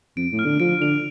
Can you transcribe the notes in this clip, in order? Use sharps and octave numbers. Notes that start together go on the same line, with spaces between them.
F2 D7
A2
F6
D3
F3 D7
D3 F7